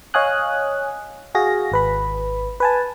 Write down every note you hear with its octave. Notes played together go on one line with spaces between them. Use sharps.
C#5 D#5 F5 G#5 D#6 F#6
F#4 G#4 F5 A#6
G#1 B4 B5
B4 G#5 A5